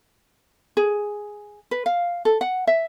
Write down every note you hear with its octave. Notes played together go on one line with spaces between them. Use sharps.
G#4
B4
F5
A4
F#5
E5